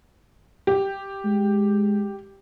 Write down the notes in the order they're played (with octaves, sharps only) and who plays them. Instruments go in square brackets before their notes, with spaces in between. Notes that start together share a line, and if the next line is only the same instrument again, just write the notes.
[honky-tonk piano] G4
[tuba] G#3